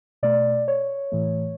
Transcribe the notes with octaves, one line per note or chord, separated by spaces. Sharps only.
B2 A3 D5
C#5
A2 E3 A3